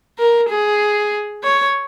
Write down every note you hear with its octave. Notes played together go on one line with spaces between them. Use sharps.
A#4
G#4
C#5